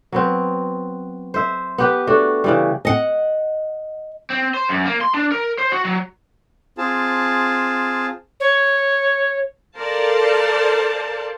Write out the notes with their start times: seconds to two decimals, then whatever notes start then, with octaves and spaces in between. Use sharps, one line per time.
0.12 F#3 B3 C4
1.34 C5 E5
1.78 B3 G4 B4
2.07 A3 D4 F#4
2.44 C#3 E3 G3
2.85 D#5 F#5
4.30 C4
4.54 C5
4.69 F#2
4.86 A#3
5.01 C6
5.14 D4
5.32 A#4
5.58 C5
5.72 F#4
5.85 F#3
6.78 C4 F4 G#4 A5
8.40 C#5
9.77 A4 A#4 C5 D5 F5 A5